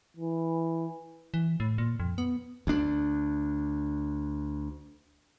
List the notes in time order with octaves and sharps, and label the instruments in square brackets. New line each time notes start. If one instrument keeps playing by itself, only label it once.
[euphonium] E3
[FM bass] E3
A2
A#2
F2
B3
[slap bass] D2 D4